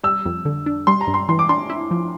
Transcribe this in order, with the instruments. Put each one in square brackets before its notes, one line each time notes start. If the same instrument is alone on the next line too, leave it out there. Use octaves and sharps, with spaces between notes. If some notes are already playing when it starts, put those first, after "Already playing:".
[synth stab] G3 [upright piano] E6
[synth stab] F2
D3
D4
[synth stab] G3 [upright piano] C6
[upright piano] A#5
[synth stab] G2
[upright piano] C6
[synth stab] E3 [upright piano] C6
[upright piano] D6
[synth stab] D4 [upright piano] C6
[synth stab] E4
F3